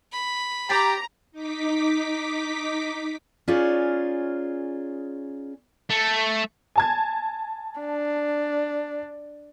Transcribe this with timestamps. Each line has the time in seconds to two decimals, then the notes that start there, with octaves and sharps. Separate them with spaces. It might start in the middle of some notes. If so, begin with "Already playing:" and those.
0.12 B5
0.69 G4 G5 A#5 A6 B6
1.32 D#4 D6 B6
3.48 C#4 D#4 F4 G#4 C#5 D5
5.90 A3
6.76 G#5 A5 G#6
7.81 D4